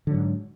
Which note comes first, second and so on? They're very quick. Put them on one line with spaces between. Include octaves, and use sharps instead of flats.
D3 F#3 G#2